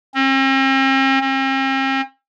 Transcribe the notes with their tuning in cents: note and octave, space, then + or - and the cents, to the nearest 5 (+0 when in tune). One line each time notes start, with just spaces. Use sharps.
C4 +45
C4 +45